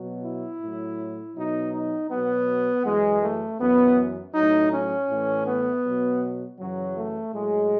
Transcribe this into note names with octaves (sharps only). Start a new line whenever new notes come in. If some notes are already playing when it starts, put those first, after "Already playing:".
Already playing: B2 F#3
E4
A2 F#3
B2 F#3 D#4
D#4
B2 F#3 B3
F#2 E3 G#3
A3
F#2 E3 B3
A2 F#3 D#4
C#4
A2 E3
B3
B2 F#3
F#2 C#3 E3 F#3
A3
A2 F#3 G#3